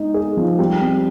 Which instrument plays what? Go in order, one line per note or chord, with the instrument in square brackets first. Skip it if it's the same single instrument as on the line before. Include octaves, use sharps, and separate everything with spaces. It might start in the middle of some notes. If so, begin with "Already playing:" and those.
Already playing: [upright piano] G#3 D#4
G#4
F3
G3
C4